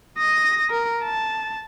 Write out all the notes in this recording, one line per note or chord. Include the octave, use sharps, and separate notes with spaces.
D#6 A#6
A#4
A5